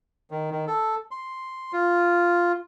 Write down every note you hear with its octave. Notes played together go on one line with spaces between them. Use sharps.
D#3
D#3
A4
C6
F4